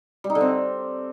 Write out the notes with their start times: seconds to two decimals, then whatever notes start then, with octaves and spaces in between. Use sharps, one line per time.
0.24 G3
0.30 D#4
0.35 D3
0.41 C4